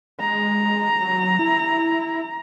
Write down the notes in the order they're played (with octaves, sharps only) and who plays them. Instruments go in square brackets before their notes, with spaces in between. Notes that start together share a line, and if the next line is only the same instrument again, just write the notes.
[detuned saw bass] G#3 [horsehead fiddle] A#5
[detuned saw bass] F#3
E4